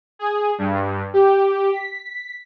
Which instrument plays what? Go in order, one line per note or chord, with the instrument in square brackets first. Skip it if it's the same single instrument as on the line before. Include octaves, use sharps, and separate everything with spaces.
[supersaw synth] G#4
G2
G4
B6